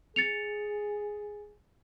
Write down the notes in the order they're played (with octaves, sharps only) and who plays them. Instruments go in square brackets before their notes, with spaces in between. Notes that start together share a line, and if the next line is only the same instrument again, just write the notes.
[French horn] G#4 [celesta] A6 C#7 F7